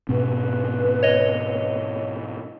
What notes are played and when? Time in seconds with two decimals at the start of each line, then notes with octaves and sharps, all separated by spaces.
0.09 G#2 B2 C4 B4
1.03 C#5 D#5